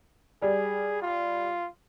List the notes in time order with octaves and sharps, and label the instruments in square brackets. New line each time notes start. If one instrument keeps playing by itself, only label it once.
[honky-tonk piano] G3 [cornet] G#4
[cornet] F4